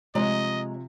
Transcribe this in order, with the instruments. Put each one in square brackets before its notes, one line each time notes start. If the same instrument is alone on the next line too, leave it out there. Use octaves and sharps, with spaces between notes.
[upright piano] C3 F3 [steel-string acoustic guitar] G#3 C#5 A#5 [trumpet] D#5